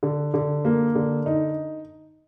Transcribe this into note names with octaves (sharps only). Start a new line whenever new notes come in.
D3
D3
A#3
D3
D#4